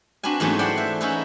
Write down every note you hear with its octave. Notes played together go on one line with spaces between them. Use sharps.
C4 D4 F#4 B4 G#5
G#2 E3 F#3 A3 B3 C#4
C5 D5 F#5 G5 B5 C6
E5
C#4 D#4 E4 F#4 A4 B4